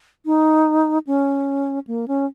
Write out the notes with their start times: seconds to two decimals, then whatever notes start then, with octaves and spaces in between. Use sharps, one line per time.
0.26 D#4
1.07 C#4
1.87 A#3
2.08 C#4